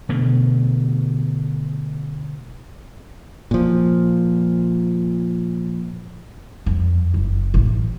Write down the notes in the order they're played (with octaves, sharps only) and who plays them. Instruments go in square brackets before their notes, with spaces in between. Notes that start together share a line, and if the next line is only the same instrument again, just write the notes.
[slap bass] B2 D3 A3
[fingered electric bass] A#2 F3
[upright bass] F2
F#1
A1